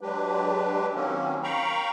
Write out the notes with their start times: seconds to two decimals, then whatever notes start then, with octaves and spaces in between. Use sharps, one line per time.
0.01 F#3 G#3 D4 G4 B4
0.94 D#3 F#3 A#3 C4 C#4
1.43 F5 G5 A#5 B5 C#6